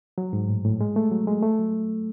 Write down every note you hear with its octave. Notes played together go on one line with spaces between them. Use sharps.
F#3
G#2
A2
A2
G#3
A3
F#3
G#3
A3
F#3